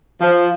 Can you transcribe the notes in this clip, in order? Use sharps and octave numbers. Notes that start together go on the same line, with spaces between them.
F3